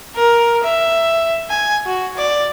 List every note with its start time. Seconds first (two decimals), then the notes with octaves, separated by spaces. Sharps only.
0.15 A#4
0.63 E5
1.50 G#5
1.86 F#4
2.17 D5